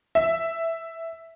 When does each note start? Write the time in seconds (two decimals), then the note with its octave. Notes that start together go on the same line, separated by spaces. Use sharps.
0.15 E5